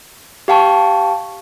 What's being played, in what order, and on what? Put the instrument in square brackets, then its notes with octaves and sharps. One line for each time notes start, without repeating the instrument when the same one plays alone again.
[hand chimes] G4 F5 G5 A5 C#6